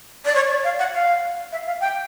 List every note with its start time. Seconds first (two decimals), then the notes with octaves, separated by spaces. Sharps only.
0.25 D5
0.35 C#5
0.50 D5
0.64 F5
0.79 F#5
0.94 F5
1.52 E5
1.67 F5
1.81 G5